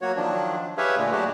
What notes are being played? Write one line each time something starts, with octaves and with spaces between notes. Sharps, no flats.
F#3 A#3 F#4 C#5
D#3 F3 F#3 D4
G4 G#4 B4 C#5 E5 F5
A#2 D3 G#3 A3
F#3 G#3 A3 D4 F#4 G4